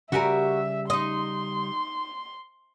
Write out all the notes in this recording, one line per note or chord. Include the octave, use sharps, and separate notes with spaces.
C#3 G3 F#4 G4 A#4 E5 G#5
D#4 D#5 C6